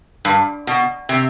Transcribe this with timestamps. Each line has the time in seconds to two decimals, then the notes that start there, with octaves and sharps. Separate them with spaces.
0.25 G2
0.67 B2
1.09 C3